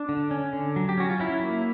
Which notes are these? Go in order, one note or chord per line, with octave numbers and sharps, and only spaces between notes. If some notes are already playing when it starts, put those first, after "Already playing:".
Already playing: D4
D3
C#4
D3
F#3
G4
C#4 F#4
F4
F#3 E4
A#3